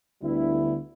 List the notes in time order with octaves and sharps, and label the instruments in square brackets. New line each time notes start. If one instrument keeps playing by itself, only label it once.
[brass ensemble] D2 D3 G3 B3 E4